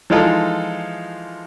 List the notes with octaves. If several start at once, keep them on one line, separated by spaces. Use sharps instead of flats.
E3 F3 G#3 D#4 F4 A4